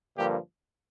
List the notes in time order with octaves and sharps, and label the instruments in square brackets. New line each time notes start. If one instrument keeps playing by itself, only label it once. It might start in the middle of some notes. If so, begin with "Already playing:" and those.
[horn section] G2 D3 F3 A#3 G4